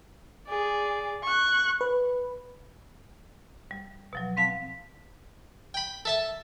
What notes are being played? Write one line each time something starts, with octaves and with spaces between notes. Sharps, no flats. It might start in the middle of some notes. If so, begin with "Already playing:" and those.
G#4 D5
C#6 F#6
B4
G3
B2 F3 F#3
C4 F5 A5 B6
G5 B5
A4 E5 A5